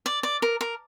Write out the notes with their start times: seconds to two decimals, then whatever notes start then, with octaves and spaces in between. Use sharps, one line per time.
0.06 D5
0.23 D5
0.42 A#4
0.61 A#4